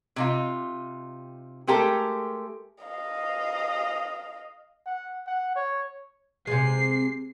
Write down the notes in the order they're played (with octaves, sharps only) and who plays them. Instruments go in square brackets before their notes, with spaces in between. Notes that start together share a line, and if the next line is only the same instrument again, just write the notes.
[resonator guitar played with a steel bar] C3 D#4 F4
G#3 A3 G4 A4 A#4
[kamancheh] D#5 F5
[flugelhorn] F#5
F#5
C#5
[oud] C3 G#3 [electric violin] C7